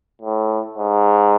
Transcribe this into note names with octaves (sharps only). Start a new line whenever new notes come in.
A2
G#2